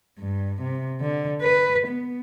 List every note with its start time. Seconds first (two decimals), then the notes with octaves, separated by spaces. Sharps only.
0.19 G2
0.62 C3
1.01 D3
1.42 B4
1.88 B3